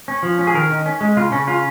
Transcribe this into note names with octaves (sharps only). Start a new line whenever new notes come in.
C#4
F3
C#4
G#4
D#3 A#4
D#3
C#4
G#3
C#3 F4
C#3 C#4
C#4 F4